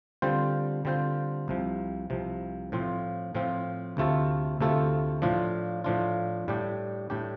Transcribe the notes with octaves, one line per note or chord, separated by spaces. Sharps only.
D3 G3 C4 F4 C5
D3 G3 C4 F4 C5
C2 C3 F3
C2 C3 F3
A2 F3 C4 F4
A2 F3 C4 F4
D2 C3 A3 F4 A4
D2 C3 A3 F4 A4
A2 F3 D4 F4
A2 F3 D4 F4
A2 G3 D4 G4
A2 G3 D4 G4